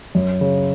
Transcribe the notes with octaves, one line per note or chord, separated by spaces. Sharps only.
F#2
C#3